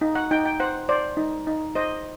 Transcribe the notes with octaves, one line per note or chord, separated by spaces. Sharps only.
D#4
F#5
D#4 G5
G5
C5 F#5
C5 D5
D#4
D#4
C5 D#5